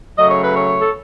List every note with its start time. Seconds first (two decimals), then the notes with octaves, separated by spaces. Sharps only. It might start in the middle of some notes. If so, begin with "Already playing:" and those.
0.18 C#3 F#3 A3 D#5
0.30 C#5
0.43 B4
0.57 C#5
0.80 A4